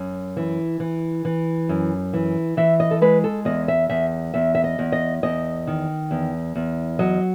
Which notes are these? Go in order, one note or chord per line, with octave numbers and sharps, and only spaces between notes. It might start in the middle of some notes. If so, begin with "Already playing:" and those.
Already playing: F#2
E3
E3
E3
F#2
E3
E3 E5
D#5
A4
G#3 B4
A4
E2 D#5
E5
E2 E5
E2 E5
E5
D#5
E2
D#5
E2 D#5
D#3
E2
E2
F#3 D#5